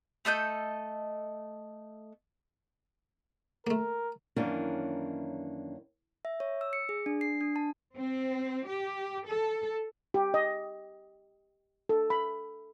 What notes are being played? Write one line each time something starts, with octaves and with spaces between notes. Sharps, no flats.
A3 A4 D#5 G6
A3 A#3 A#4
F#2 D#3 E3 A#3 C#4 D4
E5
C#5
E6
C#7
G#4
D4
C7
D4
A5
C4
G4
A4
G4
D#5
A4
B5